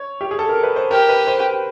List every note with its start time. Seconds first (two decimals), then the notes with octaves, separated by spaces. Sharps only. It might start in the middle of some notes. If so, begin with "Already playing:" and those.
Already playing: C#5
0.21 G4
0.31 G#4
0.39 A4
0.49 A#4
0.63 B4
0.76 C5
0.91 G4 A#4
1.09 B4
1.27 C5